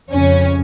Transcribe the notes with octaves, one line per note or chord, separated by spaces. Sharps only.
F2 C#3 C#4